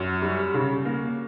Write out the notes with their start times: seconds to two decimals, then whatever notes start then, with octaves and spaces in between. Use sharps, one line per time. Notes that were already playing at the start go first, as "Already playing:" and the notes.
Already playing: F#2 F#4
0.22 G3
0.54 C#3
0.85 A#3